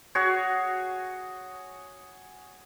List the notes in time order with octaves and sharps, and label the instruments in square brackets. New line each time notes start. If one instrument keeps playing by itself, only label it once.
[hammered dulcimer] F#4 G#4 C#5